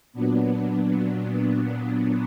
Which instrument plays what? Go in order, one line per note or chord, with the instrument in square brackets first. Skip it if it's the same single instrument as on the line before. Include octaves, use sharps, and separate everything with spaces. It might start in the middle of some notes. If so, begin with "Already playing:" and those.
[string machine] A#2 F#3 B3 D4